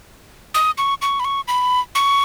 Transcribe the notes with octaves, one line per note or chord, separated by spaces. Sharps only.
D#6
C#6
C#6
B5
C#6
B5
C#6